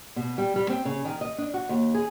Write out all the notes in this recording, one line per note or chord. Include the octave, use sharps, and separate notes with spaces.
B2
G3
G3
C4
C#3
D#3
D#5
D4
F#4
D#2
G#4